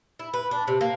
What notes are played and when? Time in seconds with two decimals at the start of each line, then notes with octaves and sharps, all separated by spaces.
0.19 E4
0.33 B4
0.51 D4
0.67 C3
0.81 A#3